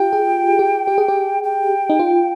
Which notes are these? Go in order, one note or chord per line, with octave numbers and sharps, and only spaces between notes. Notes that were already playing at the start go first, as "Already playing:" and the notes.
Already playing: F4 G4 G5
G#4
G4
G4
G#4
G4
G5
D#4
F4